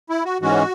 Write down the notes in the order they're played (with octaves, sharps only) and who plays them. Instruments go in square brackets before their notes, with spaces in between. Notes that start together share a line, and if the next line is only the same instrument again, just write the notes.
[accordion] E4
F#4
G#2 E3 G#3 C#4 F#4